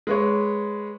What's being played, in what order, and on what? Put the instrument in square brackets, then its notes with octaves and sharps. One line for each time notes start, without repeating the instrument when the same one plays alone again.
[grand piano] G#3 B4 C#5